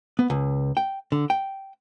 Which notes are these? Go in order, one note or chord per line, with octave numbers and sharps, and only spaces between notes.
B3
C#2
G5
D3
G5